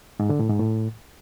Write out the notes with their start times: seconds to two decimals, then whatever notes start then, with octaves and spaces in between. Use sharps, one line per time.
0.20 G#2
0.30 D3
0.39 A2
0.49 G#2
0.59 A2